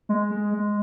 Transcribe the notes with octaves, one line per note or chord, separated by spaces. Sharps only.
G#3
G#3
G#3